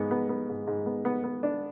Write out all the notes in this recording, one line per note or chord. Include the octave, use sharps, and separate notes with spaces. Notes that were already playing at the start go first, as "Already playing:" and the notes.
Already playing: G#2 B3
B3
B3
G#2
G#2
B3
B3
B3
D4